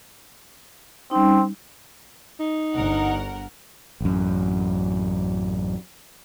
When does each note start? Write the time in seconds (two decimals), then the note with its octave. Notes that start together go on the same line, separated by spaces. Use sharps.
1.11 G3 C4 C#4 D#4
2.40 D#4
2.75 G1 A#4 F#5
4.01 A1 F#2